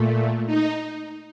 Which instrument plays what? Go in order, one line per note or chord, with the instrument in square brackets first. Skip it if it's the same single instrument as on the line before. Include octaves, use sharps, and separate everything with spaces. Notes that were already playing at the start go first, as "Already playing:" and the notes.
Already playing: [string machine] A#2 A3
D#4